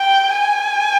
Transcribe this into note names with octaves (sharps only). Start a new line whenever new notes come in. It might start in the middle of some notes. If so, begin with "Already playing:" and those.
Already playing: G5
G#5